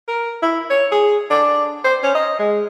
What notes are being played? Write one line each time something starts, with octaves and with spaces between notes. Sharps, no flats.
A#4
E4
C#5
G#4
D4
C5
C#4
D#5
G#3